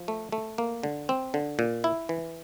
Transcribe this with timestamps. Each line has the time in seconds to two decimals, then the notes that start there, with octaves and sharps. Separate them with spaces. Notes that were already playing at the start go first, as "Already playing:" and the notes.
Already playing: F3
0.08 A3
0.32 A3
0.58 A#3
0.83 D3
1.09 C4
1.34 D3
1.59 A#2
1.84 E4
2.09 E3